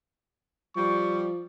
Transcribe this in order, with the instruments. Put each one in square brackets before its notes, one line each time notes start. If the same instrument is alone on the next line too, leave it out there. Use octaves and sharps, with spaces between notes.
[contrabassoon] F3 [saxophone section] G3 [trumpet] C#6